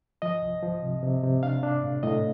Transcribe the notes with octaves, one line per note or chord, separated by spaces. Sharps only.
F3 D#5
C2
F3
C3
C3
C3
D4 F5
D4
A2
A2 D#5